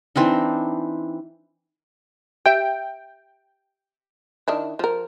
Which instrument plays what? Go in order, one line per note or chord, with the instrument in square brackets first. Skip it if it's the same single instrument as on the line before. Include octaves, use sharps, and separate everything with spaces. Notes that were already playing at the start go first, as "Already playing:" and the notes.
[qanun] E3 C4 D4 D#4
[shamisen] G4 E5 [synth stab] G5
[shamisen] D#3 D4 E4
F3 A#4